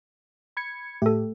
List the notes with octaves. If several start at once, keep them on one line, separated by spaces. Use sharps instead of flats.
B5 G#6 C#7
A2 A3 G4 A4